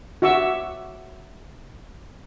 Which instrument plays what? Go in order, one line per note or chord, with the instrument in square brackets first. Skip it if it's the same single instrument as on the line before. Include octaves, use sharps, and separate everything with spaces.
[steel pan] F#4 E5 C#6 D6 E6